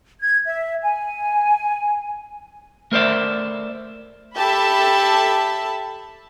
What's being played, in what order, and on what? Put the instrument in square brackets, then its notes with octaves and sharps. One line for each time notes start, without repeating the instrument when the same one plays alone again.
[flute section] G#6
E5
G#5
[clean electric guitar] A3 A#4 C5 D5 E5
[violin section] G4 A4 E5 A5 B5